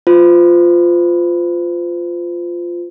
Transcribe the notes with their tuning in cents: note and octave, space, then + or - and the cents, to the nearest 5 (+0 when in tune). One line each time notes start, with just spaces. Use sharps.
F4 +0 C5 -40